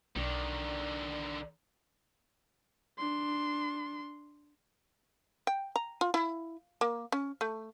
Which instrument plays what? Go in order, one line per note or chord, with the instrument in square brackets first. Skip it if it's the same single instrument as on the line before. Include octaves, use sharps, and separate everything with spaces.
[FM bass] B1 [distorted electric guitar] D3 D#3 [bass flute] D5
[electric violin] D4 C6
[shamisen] G5
A#5
F4
E4
A#3
C#4
A3